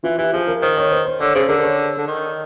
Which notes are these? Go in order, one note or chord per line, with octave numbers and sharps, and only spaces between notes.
E3 F4
E3 G4
F3 G#4
A#4
D#3 C5
C#5
C5
C5
D3 C#5
C#3 C5
D3 A#4
C#5
D3
D#3